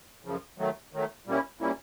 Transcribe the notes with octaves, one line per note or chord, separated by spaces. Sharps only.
F#2 C#3 F3
D#3 F#3 A3
D#3 F#3 A3
A#2 G3 A#3 C#4 E4
A#2 G3 A#3 C#4 E4